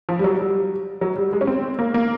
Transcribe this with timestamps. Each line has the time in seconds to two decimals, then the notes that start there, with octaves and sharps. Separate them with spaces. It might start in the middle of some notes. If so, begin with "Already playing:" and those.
0.09 F3
0.19 G3
0.24 F#3
0.39 G3
1.01 F#3
1.16 G3
1.33 G#3
1.41 C#4
1.47 C4
1.79 A#3
1.94 A#3